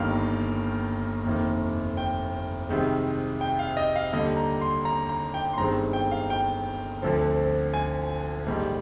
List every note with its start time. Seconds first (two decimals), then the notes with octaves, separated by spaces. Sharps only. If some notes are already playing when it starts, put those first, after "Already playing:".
Already playing: G1 G2 D#3 A#3 F5
1.25 F1 D#2 D#3 A#3
1.97 G5
2.69 C2 C3 D#3 G#3
3.41 G5
3.59 F5
3.77 D#5
3.96 F5
4.13 D#2 D3 G3 D#5
4.37 A#5
4.61 C6
4.85 A#5
5.09 A#5
5.34 G5
5.53 C6
5.57 G1 G2 D#3 G#3 C4 A#5
5.93 G5
6.12 F5
6.30 G5
7.02 D2 D3 F3 C4
7.74 G#5
8.46 A#1 G#2 D#3 G3